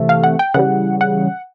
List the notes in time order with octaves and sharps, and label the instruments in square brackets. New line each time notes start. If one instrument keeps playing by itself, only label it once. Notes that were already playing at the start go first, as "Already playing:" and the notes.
Already playing: [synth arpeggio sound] C3 E3 A3
F5
F#5
G5
C#3 E3 G3 F#5
F#5